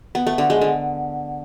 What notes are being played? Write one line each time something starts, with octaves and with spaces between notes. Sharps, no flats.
B3
A3
D3
G#3
D3